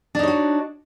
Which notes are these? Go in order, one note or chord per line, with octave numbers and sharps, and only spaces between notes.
D4 D#4 F#4 C#5